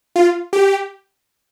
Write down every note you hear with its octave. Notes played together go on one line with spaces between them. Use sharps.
F4
G4